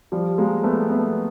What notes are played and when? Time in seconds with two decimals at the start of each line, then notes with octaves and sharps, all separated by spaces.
0.12 F3 G3
0.38 G#3 A#3
0.64 A3 B3
0.89 A3 B3